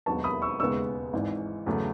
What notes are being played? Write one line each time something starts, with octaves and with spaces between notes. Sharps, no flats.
E1 D#2 D#3 F#3 B3 A5 C#6
B5 D#6
C#6 E6
E1 D#2 C#3 G#3 B3 C#6 E6
G#1 G#2 E3
E2 C#3 F#3 A3